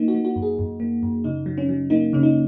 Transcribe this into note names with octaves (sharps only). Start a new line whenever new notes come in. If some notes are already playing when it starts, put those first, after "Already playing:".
Already playing: A#3 D#4
F#4
A#3
F#4
F#2
G#4
F#2
A#3
F#2
C#3 D#4
F#3
C#4
F#3
A#3 D#4
C#3 C#4
D#4